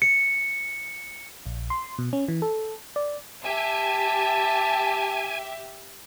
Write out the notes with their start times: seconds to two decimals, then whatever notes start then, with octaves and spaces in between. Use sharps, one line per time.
0.02 C#7
1.46 A#1
1.70 C6
1.99 B2
2.13 C#4
2.28 E3
2.42 A4
2.96 D5
3.45 G4 E5 G#5 A5